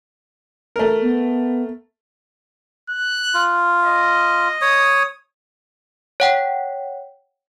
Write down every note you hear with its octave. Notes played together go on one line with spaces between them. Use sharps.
A3 A#4
B3
F#6
F4
D#5
C#5 D#6
C#5 F#5 G5